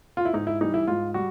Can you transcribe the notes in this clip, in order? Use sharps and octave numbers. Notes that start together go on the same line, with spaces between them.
F4
E4
G#2 D#4
E4
E3 G3 D#4
E4
G#2 F4
G3 F#4